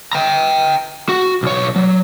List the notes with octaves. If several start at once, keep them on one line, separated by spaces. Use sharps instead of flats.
G5 A#5
F#4
B1 C#5
F#3